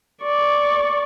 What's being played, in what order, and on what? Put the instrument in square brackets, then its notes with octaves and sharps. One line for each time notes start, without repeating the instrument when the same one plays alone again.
[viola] D5 C#6